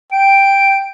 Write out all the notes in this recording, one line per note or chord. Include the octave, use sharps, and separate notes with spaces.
G5 D7